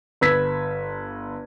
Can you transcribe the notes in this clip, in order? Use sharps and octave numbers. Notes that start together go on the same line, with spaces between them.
G1 B4 E6 G#6 B6